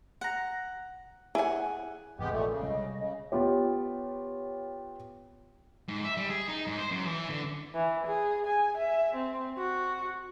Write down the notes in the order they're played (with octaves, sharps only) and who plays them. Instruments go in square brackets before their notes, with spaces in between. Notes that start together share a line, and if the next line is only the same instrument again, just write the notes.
[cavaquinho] F#5 A#5
[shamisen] E4 G#5 [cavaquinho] G#4 F#5
[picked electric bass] G#1 E2 C3 [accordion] G#3 B3 G4
[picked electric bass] A#1 [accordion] A#2 A3 [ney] A4
[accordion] C#3
[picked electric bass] C3 G3 G#3 [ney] D#5
[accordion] C#3
[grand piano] B3 F4 G4 C#5
[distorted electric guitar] G#2
E5
G3
G#4
D#4
G#2
C5
F#2
E3
D3
[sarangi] E3
G#4
G#5
E5
C4
F#4